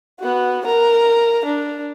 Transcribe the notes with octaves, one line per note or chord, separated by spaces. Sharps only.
B3 F#4
A#4 A#5
D4